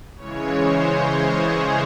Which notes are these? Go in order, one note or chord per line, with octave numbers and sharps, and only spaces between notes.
C#3 E3 G#3 C#5
C5
G#4